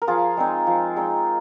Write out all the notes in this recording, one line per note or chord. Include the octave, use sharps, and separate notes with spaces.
A#4
F3 F4 G#4
G#3 C4 D#4
F3
G#3 C4 D#4